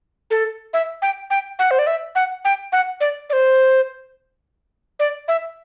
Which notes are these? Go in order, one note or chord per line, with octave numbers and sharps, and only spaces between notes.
A4
E5
G5
G5
F#5
C5
D5
E5
F#5
G5
F#5
D5
D5
C5
D5
E5